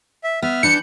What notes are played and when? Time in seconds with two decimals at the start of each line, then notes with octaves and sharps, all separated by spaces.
0.24 E5
0.42 B3 E5 F6
0.63 E3 D4 G6 C#7